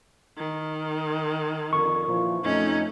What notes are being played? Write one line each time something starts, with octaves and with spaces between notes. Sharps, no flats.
D#3
F2 D3 A#4 C#6
A#2 E3 F3
F2 A3 C#4 D#4